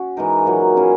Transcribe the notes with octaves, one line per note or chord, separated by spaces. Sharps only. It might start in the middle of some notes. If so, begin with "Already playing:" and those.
Already playing: C#4 F#4
E3 G#3 D#4 A#4
A#2 F#3 A#3
A#3 C#4 E4 G#4